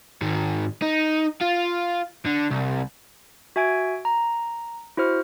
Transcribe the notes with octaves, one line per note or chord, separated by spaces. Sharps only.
G#2 D#3
D#4
F4
D3
C2
F#4 E5 G#5 G#6 D7
A#5
E4 F#4 C5 F6